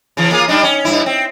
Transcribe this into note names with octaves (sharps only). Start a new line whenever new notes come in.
C#3 E3
A#3 F4 G#4
G3 D4 D#4
C#4
G2 E4
C4